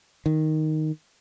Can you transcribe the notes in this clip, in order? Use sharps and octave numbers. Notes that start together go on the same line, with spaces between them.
D#3